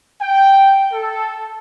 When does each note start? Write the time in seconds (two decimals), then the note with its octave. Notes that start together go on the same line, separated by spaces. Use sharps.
0.21 G5
0.93 A4